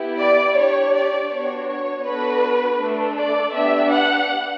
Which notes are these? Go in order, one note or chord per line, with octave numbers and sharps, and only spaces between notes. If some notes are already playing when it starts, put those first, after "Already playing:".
Already playing: B3 E4 G4
D5
D4 G4 C#5
D5
B3 D4 F#4 C#5
C#5
B3 D4 F#4 A4 B4
A3 D4 A4
D5
B3 D4 G4 E5
F#5